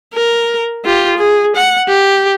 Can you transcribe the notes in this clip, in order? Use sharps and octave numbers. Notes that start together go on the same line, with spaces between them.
A#4
F4 G4
G#4
F#5
G4